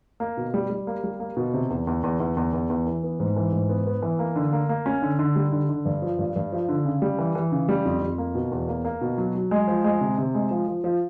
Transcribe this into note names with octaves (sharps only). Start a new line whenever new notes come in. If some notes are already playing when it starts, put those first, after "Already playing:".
A#3
B2
G3
G3
A#3
G3
A#3
B2
C3
E2
E2
E2
E2
E2
E2
E2
E3
B3
G#2
E3
G#2
B3
B3
E3
A#3
D3
A#3
A#3
C#4
D3
D3
G3
D3
D3
G2
F3
G2
G2
F3
D3
C#3
G3
E3
E3
C#3
G3
F2
F2
A#3
B2
E2
A#3
A#3
B2
F#3
F#3
G#3
F3
G#3
C3
C3
G#3
F3
F3
F3